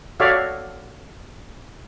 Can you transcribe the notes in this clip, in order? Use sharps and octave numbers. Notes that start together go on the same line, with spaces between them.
F#4 A4 C#5 D5 E5 F5